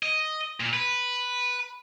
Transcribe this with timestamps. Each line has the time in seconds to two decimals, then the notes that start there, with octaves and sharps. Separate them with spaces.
0.03 D#5
0.60 A#2
0.73 B4